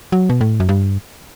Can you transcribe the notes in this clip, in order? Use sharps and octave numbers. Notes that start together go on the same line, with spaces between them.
F#3
B2
A2
F#2
G2